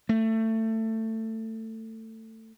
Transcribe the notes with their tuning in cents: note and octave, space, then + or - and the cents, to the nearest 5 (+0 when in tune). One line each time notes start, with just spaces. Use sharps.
A3 +20